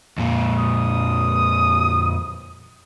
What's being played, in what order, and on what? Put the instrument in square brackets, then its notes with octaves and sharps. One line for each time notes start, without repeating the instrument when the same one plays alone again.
[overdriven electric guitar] F2 A#2
[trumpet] D#6